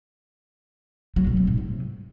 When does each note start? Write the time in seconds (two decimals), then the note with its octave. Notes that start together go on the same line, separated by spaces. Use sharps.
1.16 F#3
1.27 B2
1.37 C3
1.47 G#2
1.58 C3